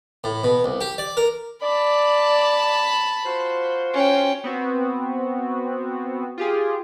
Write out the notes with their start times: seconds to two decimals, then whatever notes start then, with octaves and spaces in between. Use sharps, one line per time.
0.24 A2
0.44 B2
0.64 C2
0.81 G4
0.98 D5
1.17 A#4
1.63 D5 A5 B5
3.26 F4 F#4 C5
3.94 C#4 G5
4.44 B3 C4 F#4
6.38 F4 G4 G#4